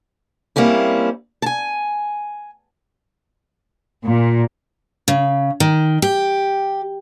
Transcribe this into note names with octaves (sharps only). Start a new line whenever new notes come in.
G3 A#3 C4 C#4 E4
G#5 A5
A#2
C#3
D#3
G4